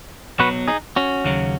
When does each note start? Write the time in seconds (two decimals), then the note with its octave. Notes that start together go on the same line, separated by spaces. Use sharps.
0.39 B1 B2 F#3 F#4 B4
0.68 D#4 G#4
0.96 C#4 F#4
1.24 D#2 C#3 F#3